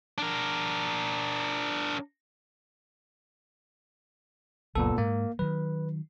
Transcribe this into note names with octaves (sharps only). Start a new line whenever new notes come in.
D4 A#4
F#1 C#2 F#2 A#2 B3 A4
G#2 A#3
D#3 F#3 B4